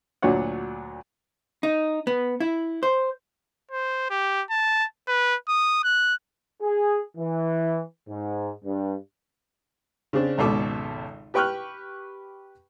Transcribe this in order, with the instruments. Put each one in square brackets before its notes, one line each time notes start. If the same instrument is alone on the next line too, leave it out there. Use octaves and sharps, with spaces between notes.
[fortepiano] D2 A#2 F#3 D4 C#5 F#5
[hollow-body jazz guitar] D#4
B3
E4
C5
[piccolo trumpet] C5
G4
A5
B4
D#6
F#6
[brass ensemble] G#4
E3
G#2
G2
[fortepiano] C#3 C4 D4
G#1 C#2 B2 A4 D6
G4 B4 G5 C#6 F6 F#6